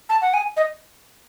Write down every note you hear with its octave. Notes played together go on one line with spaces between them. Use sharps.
A5
F#5
G#5
D#5